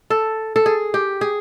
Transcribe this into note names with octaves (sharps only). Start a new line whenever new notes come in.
A4
A4
G#4
G4
G#4